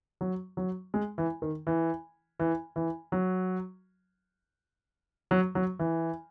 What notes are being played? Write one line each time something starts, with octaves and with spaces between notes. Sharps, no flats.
F#3
F#3
G#3
E3
D#3
E3
E3
E3
F#3
F#3
F#3
E3